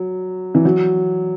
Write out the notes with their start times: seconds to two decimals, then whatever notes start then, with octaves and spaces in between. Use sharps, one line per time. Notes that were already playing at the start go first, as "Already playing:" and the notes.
Already playing: F#3
0.55 E3
0.65 F#3